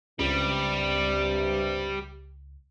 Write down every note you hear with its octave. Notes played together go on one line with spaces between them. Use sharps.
C#2 G2 C3 G3